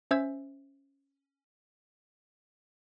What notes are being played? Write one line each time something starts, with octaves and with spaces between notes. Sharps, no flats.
C#4 C5 E5 E6 G#6